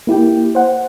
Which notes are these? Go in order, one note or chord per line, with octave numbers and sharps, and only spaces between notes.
A#3 E4 G4 G5
C5 F#5